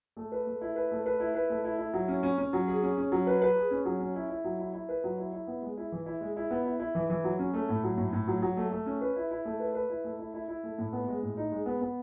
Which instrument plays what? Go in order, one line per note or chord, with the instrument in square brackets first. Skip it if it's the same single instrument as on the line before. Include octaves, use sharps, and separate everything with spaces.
[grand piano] A3
B4
A3
E4
B4
A3
B4
E4
B4
A3
E4
E4
F#3
C#4
C#4
C#4
F#3
G#4
C#4
C#4
F#3
B4
B4
G#4
C#4
F#3
C#4
E4
E4
F#3
E4
E4
B4
F#3
E4
E4
B3
G#3
E4
E3
E4
G#3
E4
B3
E4
E4
E3
E3
F#3
C#4
A3
A2
F#3
A2
A2
F#3
F#3
A3
A3
C#4
B4
E4
E4
A3
B4
B4
E4
A3
E4
E4
E4
A3
A2
B3
G#3
A2
D#4
G#3
B3
B3